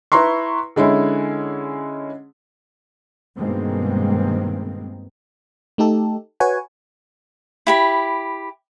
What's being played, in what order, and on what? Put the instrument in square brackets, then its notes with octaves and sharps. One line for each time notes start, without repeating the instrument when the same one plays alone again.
[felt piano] E4 B4 A#5 C6 C#6
D3 G#3 C#4 E4
[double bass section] G2 B2 D#3 G#3 A#3 C4
[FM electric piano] A3 D#4 G4 A4
F#4 B4 C#5 F#5 G#5
[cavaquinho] E4 G4 B5